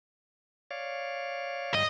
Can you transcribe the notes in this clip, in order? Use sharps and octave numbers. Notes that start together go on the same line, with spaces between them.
C#5 D5 F5
G#2 G3 D#5